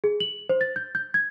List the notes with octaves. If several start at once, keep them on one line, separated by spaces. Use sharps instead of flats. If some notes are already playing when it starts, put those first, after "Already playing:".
G#4
F#7
C5
A6
G6
G6
G#6